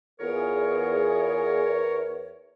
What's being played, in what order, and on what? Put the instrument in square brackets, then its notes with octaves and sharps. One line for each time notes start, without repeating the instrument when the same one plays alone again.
[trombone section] E2 [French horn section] B3 F4 G#4 [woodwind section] A#4 C#5